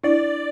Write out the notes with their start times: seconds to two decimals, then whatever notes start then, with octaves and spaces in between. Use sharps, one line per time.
0.04 D4 E4 D5